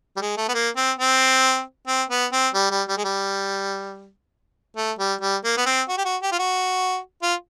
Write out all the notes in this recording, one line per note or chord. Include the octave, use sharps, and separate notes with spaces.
G3
G#3
A3
B3
A#3
C4
C4
C4
B3
C4
G3
G3
G3
G#3
G3
A3
G3
G3
A#3
B3
C4
F#4
G4
F#4
G4
F4
F#4
F4